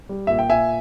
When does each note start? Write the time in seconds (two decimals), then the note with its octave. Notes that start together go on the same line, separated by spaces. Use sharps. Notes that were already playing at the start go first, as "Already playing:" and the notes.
0.09 G3
0.27 A#2 E5
0.39 G5
0.49 A#2 E5 G#5